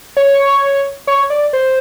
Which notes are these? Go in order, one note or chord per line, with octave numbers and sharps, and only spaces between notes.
C#5
C#5
D5
C5